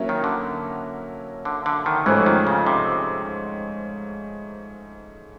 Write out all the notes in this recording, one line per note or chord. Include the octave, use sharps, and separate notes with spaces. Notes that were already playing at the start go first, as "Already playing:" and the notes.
Already playing: F#3 A#3 C#4 E4
D#3
D3
D3
D3
D#3
G#2 E3 F3 A3 C#4
D#3
C#3
C3